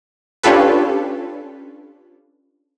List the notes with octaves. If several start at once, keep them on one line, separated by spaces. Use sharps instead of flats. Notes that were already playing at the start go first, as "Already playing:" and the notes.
C#4 D4 F4 G4 A4 B4